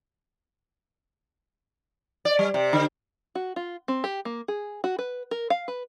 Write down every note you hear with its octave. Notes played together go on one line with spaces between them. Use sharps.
D5
G3
C3
D3
F#4
F4
C4
G4
A#3
G#4
F#4
B4
A#4
F5
B4